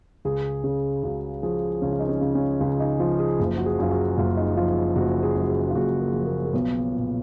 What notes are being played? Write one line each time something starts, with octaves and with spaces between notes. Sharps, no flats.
C#2 G#4
C#3 G#4
C#2 F#4
F3 G#4
C#2 C#4
F4
D#4
C#4
C#3
C#4
C#2 C#4
D#4
F3 F4
G#4
F#1
F#4
G#4
F#2 F4
F#4
F#1 F4
D#4
F3 F4
F#1 F#4
G#4
F#2
F#4
G#4
F4
F#1 F#4
A#3
F3
A#3
A#3
B1 B3
A#2